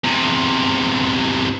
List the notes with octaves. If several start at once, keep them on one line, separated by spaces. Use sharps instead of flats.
E2 C3